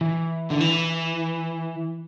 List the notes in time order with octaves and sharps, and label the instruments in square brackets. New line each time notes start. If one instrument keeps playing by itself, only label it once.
[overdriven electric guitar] E3
D3
E3